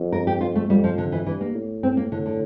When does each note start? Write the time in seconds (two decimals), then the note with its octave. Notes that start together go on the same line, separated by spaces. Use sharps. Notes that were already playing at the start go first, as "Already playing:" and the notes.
Already playing: F2
0.12 A#4
0.27 G4
0.41 F2 F4
0.56 A3
0.69 F2 G3
0.84 F3
0.98 D3
1.12 E3
1.26 G2 E3
1.41 A#3
1.54 A2
1.83 C4
1.97 A#3
2.12 A2 D3
2.26 D3